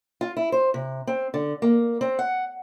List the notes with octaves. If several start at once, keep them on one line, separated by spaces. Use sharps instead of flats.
F4
E4
C5
C3
C4
D3
A#3
C4
F#5